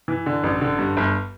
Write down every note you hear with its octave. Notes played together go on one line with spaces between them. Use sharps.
E3
D3
A1
D3
G2
G1